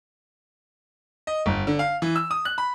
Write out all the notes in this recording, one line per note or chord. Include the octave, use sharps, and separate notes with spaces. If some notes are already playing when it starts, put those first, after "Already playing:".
D#5
G1
D3
F5
E3
E6
D#6
F#6
B5